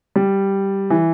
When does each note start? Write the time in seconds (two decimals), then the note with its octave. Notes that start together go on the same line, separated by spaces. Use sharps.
0.16 G3
0.90 E3